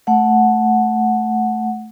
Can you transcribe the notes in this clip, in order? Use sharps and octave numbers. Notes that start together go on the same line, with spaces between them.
A3 F#5